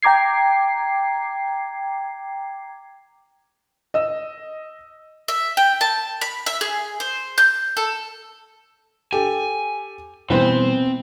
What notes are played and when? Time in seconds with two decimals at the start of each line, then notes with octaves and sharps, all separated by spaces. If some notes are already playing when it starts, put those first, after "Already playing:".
0.03 G5 A#5 D6 G#6 C7
3.94 D#5 E6
5.28 E5
5.57 G5
5.81 A5
6.21 B5
6.46 E5
6.61 G#4
7.00 C5
7.38 G6
7.77 A4
9.13 G4 A4 G#5
10.30 B2 E3 G3 B3 C4 B4 C5